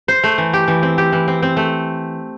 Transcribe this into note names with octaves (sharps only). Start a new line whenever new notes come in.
C5
A3
E3
G4
E3
C4
G4
E3
C4
C4
A3